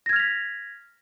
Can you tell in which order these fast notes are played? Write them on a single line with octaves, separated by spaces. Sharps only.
A#6 G#6 F6 F7 B6